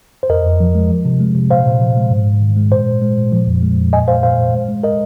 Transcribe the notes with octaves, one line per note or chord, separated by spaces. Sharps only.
C5
F2 A#4 D#5
F2
F3
G#3
F3
C3
G#3
C3
A#2 C5 F5
A#2
F3
G#3
G#2
G#2
D#3
G#3
A#2 C5
A#2
G#3
A#2
F3
F2
G#3
F2
A#2 D#5 G#5
G#3 C5 F5
A#2 C5 F5
A#2
G#3
G#3
A#4 D#5